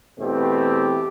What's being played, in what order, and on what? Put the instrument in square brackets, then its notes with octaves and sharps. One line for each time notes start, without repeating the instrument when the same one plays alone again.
[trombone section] E2 B2 A3 C4 G4